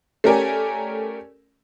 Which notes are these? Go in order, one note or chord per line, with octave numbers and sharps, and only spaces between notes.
A3 C#4 G4 A#4 D5 G#5